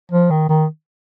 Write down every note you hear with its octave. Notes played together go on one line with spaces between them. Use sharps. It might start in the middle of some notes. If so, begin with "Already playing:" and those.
F3
D#3
D#3